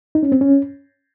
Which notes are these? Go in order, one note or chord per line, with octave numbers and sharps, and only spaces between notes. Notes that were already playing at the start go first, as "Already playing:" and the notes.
D#4
C#4
C4
C#4